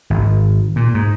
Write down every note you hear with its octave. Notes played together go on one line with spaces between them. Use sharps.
G#1
A#2
G#2